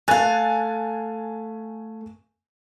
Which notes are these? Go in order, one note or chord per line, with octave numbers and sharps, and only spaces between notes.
A3 F5 G#5 F#6 A6